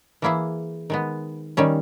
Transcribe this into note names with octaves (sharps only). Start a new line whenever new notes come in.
E3 A#3 E4 G#4
D#3 G#3 B3
D#3 G3 C#4